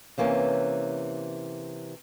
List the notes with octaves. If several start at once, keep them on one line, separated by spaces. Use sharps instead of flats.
C3 E3 A#3 C#4